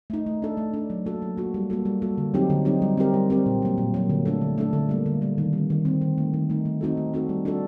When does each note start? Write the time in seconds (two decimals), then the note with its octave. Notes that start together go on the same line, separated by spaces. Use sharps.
0.10 A3 D#4
0.26 A3
0.42 D4 A4
0.57 A3
0.73 D4 A4
0.90 F#3
1.05 A#3 F#4 A4
1.22 F#3
1.37 A#3 F#4 A4
1.54 G3
1.70 A#3 F#4 A4
1.85 G3
2.02 A#3 F#4 A4
2.18 D3
2.34 F#3 C4 D#4 G4
2.50 D3
2.65 F#3 C4 D#4 G4
2.82 G3
2.97 C4 G4 A#4
3.14 G3
3.30 C4 G4 A#4
3.46 A#2
3.62 F#3 A#3
3.78 A#2
3.94 F#3 A#3
4.09 D3
4.25 A3 D4 A4
4.41 D3
4.58 A3 D4 A4
4.73 D3
4.89 G3 A#3
5.06 D3
5.21 G3 A#3
5.38 D#3
5.53 G3 C4
5.70 D#3
5.85 G3 C4
6.01 D#3
6.18 A3 D#4
6.33 D#3
6.50 A3 D#4
6.65 A3
6.81 C4 D#4 F#4 A4
6.97 A3
7.13 C4 D#4 F#4 A4
7.29 G3
7.45 D4 F#4 A4